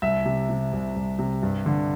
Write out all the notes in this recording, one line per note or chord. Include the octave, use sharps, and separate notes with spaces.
C2 E5
C3
C3
C2
C2
C3
G2
D3